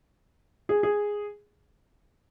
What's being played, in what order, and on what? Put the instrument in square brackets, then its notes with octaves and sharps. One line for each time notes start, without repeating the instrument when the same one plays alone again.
[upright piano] G#4
G#4